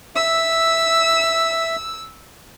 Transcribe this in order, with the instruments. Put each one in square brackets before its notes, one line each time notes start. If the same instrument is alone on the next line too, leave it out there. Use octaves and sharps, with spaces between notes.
[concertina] E5 [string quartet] E6